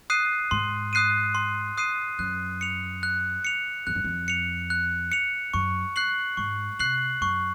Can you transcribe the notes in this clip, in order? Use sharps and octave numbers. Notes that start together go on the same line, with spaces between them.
D#6 F#6 C7 D#7
G#2 C6
D#6 F#6 C7 D#7
C6
D#6 F#6 C7 D#7
F#2 F#6
C#7 F7
F#6
C#7 F7
F2 F#6
F#2
F2
C#7 F7
F#6
C#7 F7
F#2 C#6
F#6 C7 F#7
G#2 C#6
C3 F#6 C7 F#7
F#2 C#6